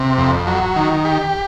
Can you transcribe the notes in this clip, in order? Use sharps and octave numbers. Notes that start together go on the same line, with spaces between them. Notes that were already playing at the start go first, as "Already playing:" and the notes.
Already playing: C3
F2
F#3
D#3
G4